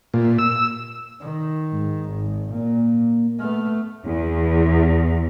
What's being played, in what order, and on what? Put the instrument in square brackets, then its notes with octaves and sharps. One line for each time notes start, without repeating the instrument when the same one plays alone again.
[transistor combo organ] A#2
E6
[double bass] D#3
[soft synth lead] G#2
[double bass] G#1
[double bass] A#2 [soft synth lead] A#3
[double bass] A3 B3 [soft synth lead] F6
[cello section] E2